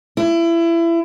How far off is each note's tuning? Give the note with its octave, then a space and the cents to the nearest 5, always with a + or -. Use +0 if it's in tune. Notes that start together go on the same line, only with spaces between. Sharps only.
E4 +25